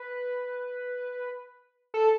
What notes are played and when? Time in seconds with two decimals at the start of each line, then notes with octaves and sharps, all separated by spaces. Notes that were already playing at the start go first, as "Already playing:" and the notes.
Already playing: B4
1.94 A4